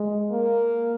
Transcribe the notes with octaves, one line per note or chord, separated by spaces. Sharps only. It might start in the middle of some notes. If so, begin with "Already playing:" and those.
Already playing: G#3
A#3